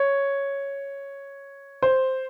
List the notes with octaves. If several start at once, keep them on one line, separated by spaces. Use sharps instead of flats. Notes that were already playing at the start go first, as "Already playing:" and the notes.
Already playing: C#5
C5